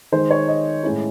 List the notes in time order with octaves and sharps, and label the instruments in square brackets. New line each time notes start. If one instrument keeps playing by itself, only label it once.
[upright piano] D#3 G#3 D#4 C5
C#5
D#5
A2 G#3 C#4 E4